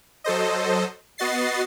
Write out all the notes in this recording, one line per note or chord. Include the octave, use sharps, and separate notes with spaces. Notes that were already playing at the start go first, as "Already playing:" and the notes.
F#3 A4 C5 D#5
B3 F#4 D#5 A6 C7